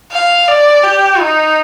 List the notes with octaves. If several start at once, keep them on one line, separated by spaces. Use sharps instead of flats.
F5
D5
G4
D#4